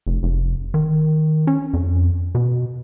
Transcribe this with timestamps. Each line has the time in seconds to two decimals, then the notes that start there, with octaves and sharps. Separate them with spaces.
0.07 F1
0.23 F1
0.74 D#3
1.47 C#4
1.73 F2
2.35 B2